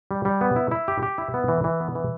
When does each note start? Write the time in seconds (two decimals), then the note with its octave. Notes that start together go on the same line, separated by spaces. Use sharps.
0.11 G3
0.25 G3
0.41 B3
0.56 E4
0.71 E4
0.88 G4
1.03 G4
1.18 E4
1.34 B3
1.48 E3
1.64 E3
1.80 B3
1.95 E3